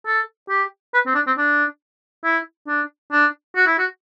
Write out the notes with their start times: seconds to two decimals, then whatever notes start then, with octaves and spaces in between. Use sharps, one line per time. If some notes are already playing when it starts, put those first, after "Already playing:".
0.07 A4
0.49 G4
0.94 B4
1.07 C4
1.15 D4
1.27 C4
1.38 D4
2.25 E4
2.68 D4
3.13 D4
3.56 F#4
3.67 E4
3.79 F#4